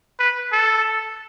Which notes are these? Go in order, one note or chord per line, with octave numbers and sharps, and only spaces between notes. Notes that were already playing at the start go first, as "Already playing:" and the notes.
B4
A4